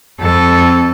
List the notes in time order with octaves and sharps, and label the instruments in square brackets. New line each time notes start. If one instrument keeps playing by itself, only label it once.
[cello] F2 A4